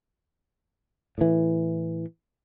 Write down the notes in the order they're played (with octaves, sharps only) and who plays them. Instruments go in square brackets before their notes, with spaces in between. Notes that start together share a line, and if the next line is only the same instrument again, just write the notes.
[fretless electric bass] A2 E3